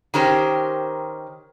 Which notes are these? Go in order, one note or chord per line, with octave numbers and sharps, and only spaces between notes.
D#3 C#4 G4 A#4 C5